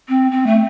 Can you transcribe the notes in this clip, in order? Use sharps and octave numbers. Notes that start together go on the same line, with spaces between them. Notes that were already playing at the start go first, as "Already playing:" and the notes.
C4
C4
A3